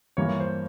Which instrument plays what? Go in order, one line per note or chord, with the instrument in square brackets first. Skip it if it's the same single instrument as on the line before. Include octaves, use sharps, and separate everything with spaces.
[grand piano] G2 E3 A#3 C#5
C5